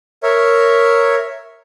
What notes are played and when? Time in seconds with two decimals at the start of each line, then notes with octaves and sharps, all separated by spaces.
0.23 A#4 C#5 E5